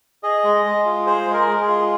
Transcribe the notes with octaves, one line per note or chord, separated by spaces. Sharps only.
G#4 D#5
G#3
G#3
F4
G#4 C5
G#3
A#4
G#3
G#4
F4